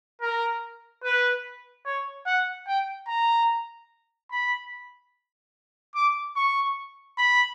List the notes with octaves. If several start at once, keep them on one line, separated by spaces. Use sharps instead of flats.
A#4
B4
C#5
F#5
G5
A#5
B5
D6
C#6
B5